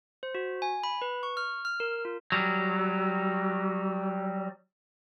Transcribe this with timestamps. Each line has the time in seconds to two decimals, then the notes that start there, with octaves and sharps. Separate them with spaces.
0.23 C5
0.35 F#4
0.62 G#5
0.84 B5
1.02 B4
1.23 C#6
1.37 F6
1.65 F6
1.80 A#4
2.05 F4
2.32 F#3 G3